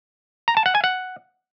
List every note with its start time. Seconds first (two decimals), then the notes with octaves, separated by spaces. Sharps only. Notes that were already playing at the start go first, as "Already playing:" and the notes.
0.48 A#5
0.57 A5
0.66 F#5
0.75 G#5
0.84 F#5